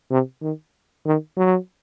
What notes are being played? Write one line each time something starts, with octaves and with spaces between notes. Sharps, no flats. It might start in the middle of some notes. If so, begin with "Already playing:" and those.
C3
D#3
D#3
F#3